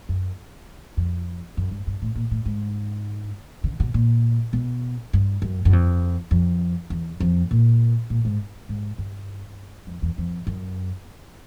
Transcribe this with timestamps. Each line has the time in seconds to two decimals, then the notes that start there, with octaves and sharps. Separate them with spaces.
0.09 F#2
0.97 F2
1.57 F#2
1.71 G2
1.87 G2
2.02 A2
2.15 A#2
2.31 A2
2.46 G#2
3.64 C#3
3.80 B2
3.94 A#2
4.53 B2
5.13 G2
5.42 F#2
5.65 F#2
5.73 F2
6.31 F2
6.90 E2
7.20 F2
7.51 A#2
8.10 A#2
8.25 G#2
8.69 G#2
8.98 G2
9.87 F2
10.02 E2
10.18 F2
10.47 F#2